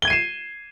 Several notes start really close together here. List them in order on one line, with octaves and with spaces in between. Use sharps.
G7 G#6 D#7 C7 E7